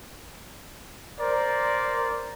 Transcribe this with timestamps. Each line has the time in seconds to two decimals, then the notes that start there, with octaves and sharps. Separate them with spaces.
1.20 A#4 C5 D5